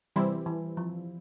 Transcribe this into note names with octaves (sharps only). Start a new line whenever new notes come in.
C3 E3 G3 C4 E4
E3
F3